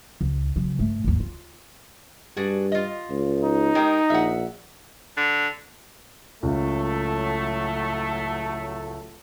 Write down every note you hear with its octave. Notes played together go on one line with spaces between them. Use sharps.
C#2
C#3 F#3
G2 A3
G#1 D#2
F4
G2 D4 F#4 G#4
F4 D#5
C#2
D#4
G#3 G4 A#4
A#1 E5 F#5
D3
C#2 A2 F#3 A3